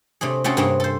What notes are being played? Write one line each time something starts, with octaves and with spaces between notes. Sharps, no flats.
C3 A3 D4 G#4
A3 C4 C#4 F#4 G#4 A4
G2 C3 A#3 C4 G#4 C#5
A4 C5